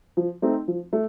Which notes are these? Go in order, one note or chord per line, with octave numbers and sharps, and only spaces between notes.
F3
A3 C4 D#4
F3
A3